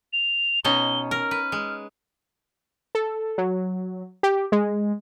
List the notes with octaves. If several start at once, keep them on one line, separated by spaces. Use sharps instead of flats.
F7
B2 C#4 D#4 G7
A#4 F6
B4
G#3
A4
F#3
G4
G#3